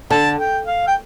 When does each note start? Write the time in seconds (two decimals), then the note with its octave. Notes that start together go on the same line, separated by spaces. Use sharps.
0.10 D3 A5
0.39 G5
0.66 F5
0.87 G5